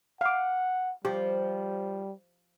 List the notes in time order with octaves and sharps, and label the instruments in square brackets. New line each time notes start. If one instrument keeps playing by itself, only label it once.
[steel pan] F5 D6 [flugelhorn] F#5
[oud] F3 [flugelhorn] G3 [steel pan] G4